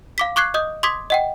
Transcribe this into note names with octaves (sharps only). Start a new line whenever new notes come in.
F5 D6 B6
C#6 D6 F#6 G#6 C7
D#5 D#6 G6
C6 D6 D#6 G#6 B6
D#5 F#5 G5